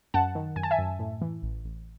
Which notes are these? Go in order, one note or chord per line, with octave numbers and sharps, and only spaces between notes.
F#2 F#5 A5
D#3
F#2 G#5
A5
E5 G#5
F#2
A2
E3
A1
A1